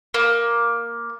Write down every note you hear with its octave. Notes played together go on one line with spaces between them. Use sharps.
A#3